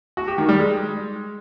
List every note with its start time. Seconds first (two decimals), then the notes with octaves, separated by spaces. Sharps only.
0.17 F#4
0.28 G4
0.38 D#3
0.49 G3
0.59 G#3